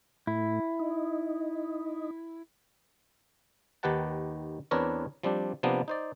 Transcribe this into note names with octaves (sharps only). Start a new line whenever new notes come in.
A2 E4
D#4
D#2 D#3 G4 B4 F#5 A5
E2 C4 D4 A#4 B4 C#5
F3 G3 C4 D4 G4
C3 F3 A#3 B3 D4
D#4 C5 D5